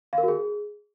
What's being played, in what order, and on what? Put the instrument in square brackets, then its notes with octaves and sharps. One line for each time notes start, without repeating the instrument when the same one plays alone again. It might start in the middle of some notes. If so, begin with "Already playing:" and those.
[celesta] F5
A#4
F#4
G#4